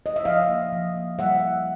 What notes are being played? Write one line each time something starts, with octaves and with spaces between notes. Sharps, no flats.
D#5
E5
F3 D#5 F5
A#3
F3
A#3
G3 E5 F#5
A#3